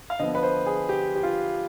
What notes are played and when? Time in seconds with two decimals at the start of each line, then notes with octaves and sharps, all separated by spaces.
0.10 F5
0.19 D3 F3 B3 D#5
0.35 B4
0.43 C5
0.66 G#4
0.89 G4
1.16 G4
1.23 F4